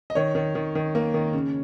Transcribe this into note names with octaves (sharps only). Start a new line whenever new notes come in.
D#5
D#3 C#5
D#3
D#3
D#3
A#3
D#3
C#3